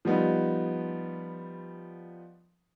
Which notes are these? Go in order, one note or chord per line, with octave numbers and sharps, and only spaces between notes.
F3 G3 B3 D#4